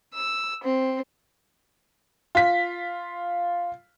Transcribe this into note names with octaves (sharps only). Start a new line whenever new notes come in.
E6
C4
F4 B6